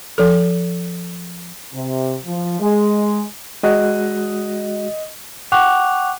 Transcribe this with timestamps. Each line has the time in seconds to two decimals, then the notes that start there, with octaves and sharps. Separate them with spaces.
0.18 F3 A4
1.74 C3
2.26 F3
2.60 G#3
3.63 G#3 F#4 D#5 F#6
5.52 F#5 G5 C#6 D6 F#6 F7